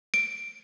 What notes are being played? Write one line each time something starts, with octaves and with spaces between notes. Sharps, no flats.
D7